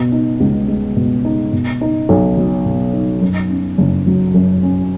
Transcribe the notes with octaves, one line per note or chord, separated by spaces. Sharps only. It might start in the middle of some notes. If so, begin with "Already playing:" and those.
Already playing: B2
D#4
C#2
G#3
B2
D#4
B2
D#4
B1
F#3
B2
D#4
F#2
C#4
F#1
F#3
F#2
C#4